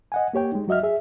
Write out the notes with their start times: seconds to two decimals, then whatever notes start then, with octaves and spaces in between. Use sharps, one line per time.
0.12 D#5 F#5 G#5
0.34 A#3 G4 C#5 G5
0.52 G#3 D#4
0.68 F#3 F#4 D#5 E5 F6
0.83 G#4 E5